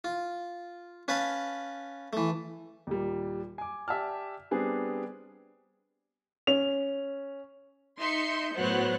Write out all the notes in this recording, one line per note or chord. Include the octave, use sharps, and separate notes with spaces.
F4
C#4 B4 F5 A5 B5
E3 A3
D#2 A#2 G3
G#5 D6
G4 D5 E5 G#5 A5 F6
G3 B3 C4 D4 G#4
C#4 F7
D#4 E5 C6 G6 C#7
A2 F#3 B3 C5 C#5 F#6